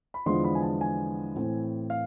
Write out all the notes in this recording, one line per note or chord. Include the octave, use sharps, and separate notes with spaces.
B5
E2 D3 F3 G#3 B3 C6
B5
G#5
A5
G#5
A2 E3 A3 C4
F5